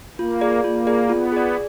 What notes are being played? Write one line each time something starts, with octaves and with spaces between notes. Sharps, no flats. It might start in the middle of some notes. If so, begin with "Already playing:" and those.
A#3 F4
G#4 D5
A#3 F4
G#4 D5
B3 F4
G#4 D5